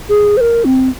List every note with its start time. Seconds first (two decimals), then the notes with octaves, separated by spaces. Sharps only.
0.09 G#4
0.37 C5
0.41 A#4
0.65 C4